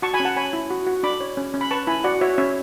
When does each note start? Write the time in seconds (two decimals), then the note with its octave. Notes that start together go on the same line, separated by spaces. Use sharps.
0.02 F#4 A5 C#6
0.14 G#5 B5
0.20 C#4
0.25 F#5 A5
0.36 C#5 G#5 B5
0.53 E4
0.70 F#4
0.87 F#4
1.03 D4 B5 D6
1.21 C#5
1.37 C#4
1.54 C#4
1.61 B5
1.71 B4 A5 C#6
1.87 E4 G#5 B5
2.04 F#4 D5 F#5
2.21 F#4 C#5 E5
2.38 C#4 C#5 E5